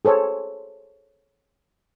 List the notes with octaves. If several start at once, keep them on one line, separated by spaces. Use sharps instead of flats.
G#4 A4 C5 C#5